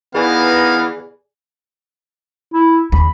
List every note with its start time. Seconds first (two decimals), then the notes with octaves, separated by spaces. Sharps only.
0.15 E3 B3 D#4 G#4 A#4 D5 F5 G#5
2.53 E4
2.92 D#2 B5